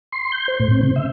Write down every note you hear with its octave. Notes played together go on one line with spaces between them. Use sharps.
C6
G6
C5
A2
C4
C#3
E5